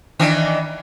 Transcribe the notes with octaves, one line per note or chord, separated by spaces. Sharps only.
D#3 E3 D4